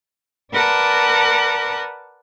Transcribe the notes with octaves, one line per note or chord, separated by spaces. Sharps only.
A#4 B4 D5 F#5 A5 D6